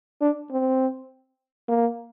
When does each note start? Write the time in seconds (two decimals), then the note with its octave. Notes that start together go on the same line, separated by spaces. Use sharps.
0.22 D4
0.51 C4
1.69 A#3